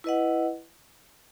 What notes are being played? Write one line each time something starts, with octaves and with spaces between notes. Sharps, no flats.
E4 B4 D#5 F#5